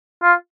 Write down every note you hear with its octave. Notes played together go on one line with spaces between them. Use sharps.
F4